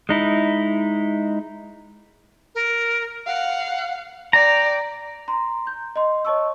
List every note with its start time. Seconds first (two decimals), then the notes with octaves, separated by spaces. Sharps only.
0.09 G#3 D#4 E4
2.55 A#4
3.26 F5 F#5
4.33 D5 G5 A#5
5.28 A#5 C6
5.67 G6
5.96 D#5 C6
6.25 C#5 D#5 A5 C#6 E6